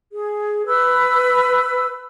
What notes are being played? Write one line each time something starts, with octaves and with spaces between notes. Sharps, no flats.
G#4
B4 E6